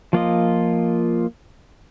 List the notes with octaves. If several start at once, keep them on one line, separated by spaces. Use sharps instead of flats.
F3 A#3 F4 D#5